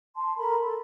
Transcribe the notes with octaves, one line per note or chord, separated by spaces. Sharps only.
A5 C6
A4 A#4 A#5 B5
A4